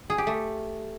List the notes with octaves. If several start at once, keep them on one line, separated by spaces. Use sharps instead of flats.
G#4
G4
A3